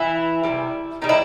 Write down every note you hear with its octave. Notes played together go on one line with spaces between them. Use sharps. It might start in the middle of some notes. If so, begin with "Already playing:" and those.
Already playing: E3 E4
C3 E3 G3
D#3 G3 D#4
E4